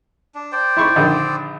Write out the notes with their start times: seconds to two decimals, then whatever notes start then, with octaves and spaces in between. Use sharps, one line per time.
0.35 D4
0.52 C5 D5 G5
0.77 E4 C6 C#6
0.96 A#1 D3 D#3